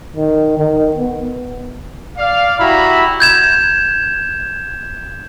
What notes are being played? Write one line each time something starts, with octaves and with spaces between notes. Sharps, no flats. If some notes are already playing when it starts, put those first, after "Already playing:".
D#3
D#3
B3
D5 F5
E4 F#4 G4 A#5 B5
G6 G#6 E7